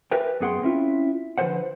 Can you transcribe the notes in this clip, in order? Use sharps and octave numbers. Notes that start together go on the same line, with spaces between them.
G4 A#4 B4 E5 G5
F#2 B3 G#4 F#5 G5 C6
C4 C#4 E4 F4
D3 F3 A4 B4 C5 F#5